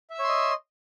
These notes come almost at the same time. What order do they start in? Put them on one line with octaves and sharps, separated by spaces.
E5 E6 C#5 C6 D#5